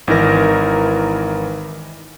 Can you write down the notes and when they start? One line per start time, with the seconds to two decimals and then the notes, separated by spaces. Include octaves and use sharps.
0.07 G#1 E3 D#4 A#4 A#6